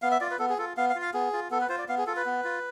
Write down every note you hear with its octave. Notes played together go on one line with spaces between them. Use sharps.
B3 F5
E5
F4 D5
B4
B3 A4
G#4
F4 A4
B3 F5
F5
F4
F5
B3 G#4
F4
B3 A4
B4
F4 C5
D5
B3 F5
G#4
F4 A4
B4
B3
F4